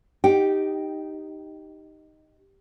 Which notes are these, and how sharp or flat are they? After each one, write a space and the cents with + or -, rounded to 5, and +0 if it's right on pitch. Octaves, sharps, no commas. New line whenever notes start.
D#4 +0 G4 +0 G5 +0